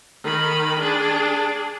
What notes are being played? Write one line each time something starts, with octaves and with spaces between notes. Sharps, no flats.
D#3 B5
D4 G#4